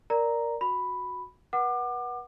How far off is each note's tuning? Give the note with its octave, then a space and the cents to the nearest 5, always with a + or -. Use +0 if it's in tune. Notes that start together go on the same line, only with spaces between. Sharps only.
A#4 +0 D5 +0 A#5 +0
F#4 -15 B5 +0
B4 -35 F#5 +5 D6 +30